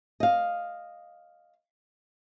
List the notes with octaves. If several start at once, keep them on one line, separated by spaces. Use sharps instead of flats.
D#5 F5